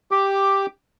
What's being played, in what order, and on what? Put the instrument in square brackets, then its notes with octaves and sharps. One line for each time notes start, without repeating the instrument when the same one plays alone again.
[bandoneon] G4 D6